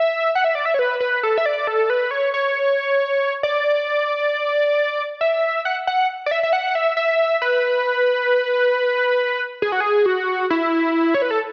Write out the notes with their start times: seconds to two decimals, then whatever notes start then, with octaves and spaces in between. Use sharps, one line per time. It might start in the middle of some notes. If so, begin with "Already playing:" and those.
Already playing: E5
0.35 F#5
0.44 E5
0.55 D5
0.65 E5
0.74 C#5
0.79 B4
1.00 B4
1.23 A4
1.38 E5
1.46 D5
1.67 A4
1.90 B4
2.11 C#5
2.34 C#5
3.43 D5
5.21 E5
5.65 F#5
5.87 F#5
6.26 D5
6.31 E5
6.43 E5
6.53 F#5
6.75 E5
6.97 E5
7.42 B4
9.62 G#4
9.72 F#4
9.80 G#4
10.06 F#4
10.50 E4
11.14 C#5
11.22 B4
11.31 A4